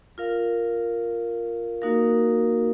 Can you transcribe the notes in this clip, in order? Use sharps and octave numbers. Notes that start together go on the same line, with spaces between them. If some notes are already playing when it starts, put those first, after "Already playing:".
F4 A#4 F5
A#3 D#4 F#4 A#4 F5